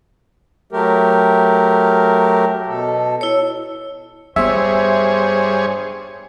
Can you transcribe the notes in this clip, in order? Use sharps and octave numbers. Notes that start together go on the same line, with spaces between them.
F#3 A3 G4 A#4
B2 A4
E4 C#5
G2 B3 F4 G#4 C5 C#5 E5